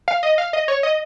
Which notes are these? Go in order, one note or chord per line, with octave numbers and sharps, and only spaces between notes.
F5
D#5
F5
D#5
C#5
D#5